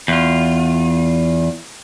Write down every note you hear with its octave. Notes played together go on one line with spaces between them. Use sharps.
E2 F4